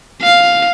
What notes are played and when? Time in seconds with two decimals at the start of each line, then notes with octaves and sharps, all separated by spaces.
0.22 F5